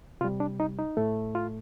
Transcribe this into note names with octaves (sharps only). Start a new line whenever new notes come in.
C3 G3 F4
D4
D#4
D#4
A2 A3
F4